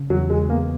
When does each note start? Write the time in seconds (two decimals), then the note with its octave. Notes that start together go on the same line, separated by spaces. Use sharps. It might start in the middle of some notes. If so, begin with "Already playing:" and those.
Already playing: C#3
0.10 E2 F#3
0.30 G#3
0.49 A#3 B3